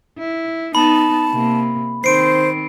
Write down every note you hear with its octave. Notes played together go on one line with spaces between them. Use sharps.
E4
B3 D#4 A5 B5
C3 A#3
D#3 C4 C5 C7 D7